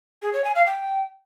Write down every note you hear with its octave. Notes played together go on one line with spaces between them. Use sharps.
G#4
C#5
G#5
F5
G5